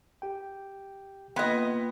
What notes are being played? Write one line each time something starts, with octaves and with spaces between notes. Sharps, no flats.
G4 G5
A#3 B3 F4 B4 D#5 G5 C6 G#6